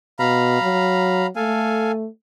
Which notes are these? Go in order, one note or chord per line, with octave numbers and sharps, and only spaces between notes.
B2 F5 A#5 B5
F#3
A3 A4 F5 G#5